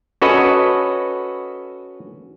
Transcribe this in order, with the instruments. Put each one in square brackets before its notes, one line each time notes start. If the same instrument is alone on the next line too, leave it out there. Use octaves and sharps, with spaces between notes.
[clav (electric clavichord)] C#4 F#4 A4 B4 D#5